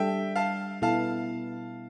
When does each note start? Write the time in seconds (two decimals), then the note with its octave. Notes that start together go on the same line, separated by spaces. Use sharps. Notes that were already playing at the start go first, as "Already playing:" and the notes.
Already playing: G3 D4 A4 E5 G5
0.36 F5 A5
0.82 B2 B3 E4 A4 F5 A5